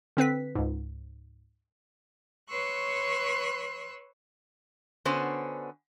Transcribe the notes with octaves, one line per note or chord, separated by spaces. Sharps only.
D3 C4 B4 B6
C#2 G#2
B4 C#5 C6 C#6 E6 F#6
D3 B3 C#4 F#4 C5